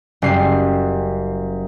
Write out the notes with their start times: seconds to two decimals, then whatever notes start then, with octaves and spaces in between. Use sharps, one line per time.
0.22 F#1 G3 C7